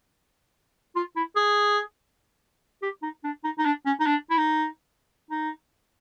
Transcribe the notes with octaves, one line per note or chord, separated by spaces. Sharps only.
F4
E4
G#4
G4
D#4
D4
D#4
D#4
D4
C#4
D#4
D4
E4
D#4
D#4